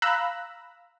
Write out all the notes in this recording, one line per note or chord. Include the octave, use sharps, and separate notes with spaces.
F5 A#5 B5 E6 F#6